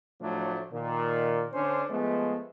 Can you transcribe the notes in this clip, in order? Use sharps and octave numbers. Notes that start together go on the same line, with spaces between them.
A2 F3 F#3 A3 D4
A#2 D#3
D3 C#4 D4 C5
F3 G#3 A3 B3